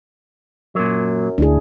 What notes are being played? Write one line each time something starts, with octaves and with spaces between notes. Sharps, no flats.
F#2 A#2 F#3
D2 D4 E4 G#4